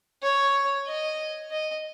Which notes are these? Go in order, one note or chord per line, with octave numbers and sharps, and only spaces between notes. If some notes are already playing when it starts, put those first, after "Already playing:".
C#5
D#5
D#5